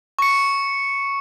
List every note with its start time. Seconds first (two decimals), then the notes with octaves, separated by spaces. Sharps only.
0.19 C#6 C#7